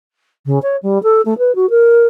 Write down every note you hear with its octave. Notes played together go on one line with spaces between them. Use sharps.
C#3
C#5
G3
A4
A3
B4
F#4
A#4